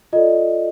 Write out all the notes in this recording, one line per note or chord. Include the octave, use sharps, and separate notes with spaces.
F4 A4 D5 D#5